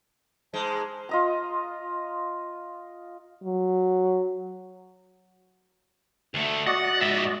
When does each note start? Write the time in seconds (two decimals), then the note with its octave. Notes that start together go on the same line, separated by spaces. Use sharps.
0.54 G#2 G#3 C5 A5
1.09 F4 D#5 A#5
3.44 F#3
6.34 D2 A3
6.66 F#4 D5 D#5 F#5
7.01 G#2 E5